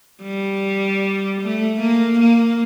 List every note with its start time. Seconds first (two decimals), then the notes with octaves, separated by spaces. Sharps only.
0.22 G3
1.41 A3
1.80 A#3
2.20 A#3